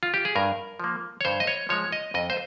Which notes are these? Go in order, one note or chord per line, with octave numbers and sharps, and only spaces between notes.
F4
G4
G#4
G2 A#4
F3 A#3
C#5
G2 C5
D#5
C#5
F3 G#3 C#5
D#5
F2 D#5
C5